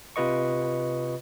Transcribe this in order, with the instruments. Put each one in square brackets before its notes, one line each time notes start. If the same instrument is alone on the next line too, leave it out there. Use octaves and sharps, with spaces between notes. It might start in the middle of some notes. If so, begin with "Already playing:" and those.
[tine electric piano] C3 F4 B4 D#5 C#6